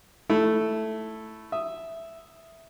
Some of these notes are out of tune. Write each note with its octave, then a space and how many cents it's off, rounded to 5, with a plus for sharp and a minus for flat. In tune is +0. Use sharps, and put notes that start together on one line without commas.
A3 +0 E4 +0
E5 +0 D#6 +0